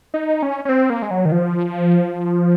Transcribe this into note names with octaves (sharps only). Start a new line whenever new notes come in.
D#4
C#4
C#4
C4
A#3
G#3
F#3
D#3
F3